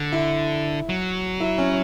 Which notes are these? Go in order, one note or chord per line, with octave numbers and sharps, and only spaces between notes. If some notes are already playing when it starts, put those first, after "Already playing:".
Already playing: D3
E4
F#3
E4
C#4